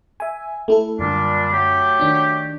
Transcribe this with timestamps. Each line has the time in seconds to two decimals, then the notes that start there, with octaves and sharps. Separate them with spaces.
0.20 E5 G#5
0.68 A3 E4 A4
0.99 F#2 A#2 D3 G3 D4
1.53 F#3 A3 G4
1.99 D#3 D4 D#4